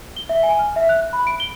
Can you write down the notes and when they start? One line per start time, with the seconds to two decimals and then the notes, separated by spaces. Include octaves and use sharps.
0.16 G7
0.29 E5
0.43 G#5
0.59 F6
0.76 E5
0.89 F#6
1.13 B5
1.27 D7
1.40 G7